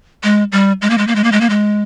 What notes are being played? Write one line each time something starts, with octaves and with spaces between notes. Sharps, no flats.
G#3
G3
G#3
A#3
G#3
A#3
G#3
A#3
G#3
A#3
G#3